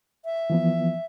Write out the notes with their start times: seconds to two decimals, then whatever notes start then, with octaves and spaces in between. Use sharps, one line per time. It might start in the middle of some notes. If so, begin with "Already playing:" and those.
0.25 E5
0.50 E3 F3 B3